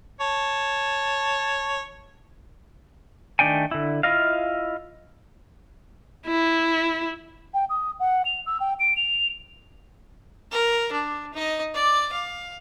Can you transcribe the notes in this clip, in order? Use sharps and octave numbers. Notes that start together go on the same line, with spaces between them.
C#5 A5
D#3 A3 D4 D5 G5 G#5
D3 E4
E4 F4 D#5 F5
E4
G5
D#6
F#5
F7
E6
G5
D7
F7
A#4
D4
D#4 D#5
D5 D6
F5